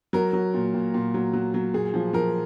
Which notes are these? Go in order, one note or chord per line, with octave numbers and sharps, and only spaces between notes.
F#3 A#4
F#3
A#2
A#2
A#2
F#3
F#3
F#3
A#2 G#4
F3
F3 A#4